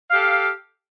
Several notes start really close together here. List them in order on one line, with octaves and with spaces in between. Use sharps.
F5 G4 A4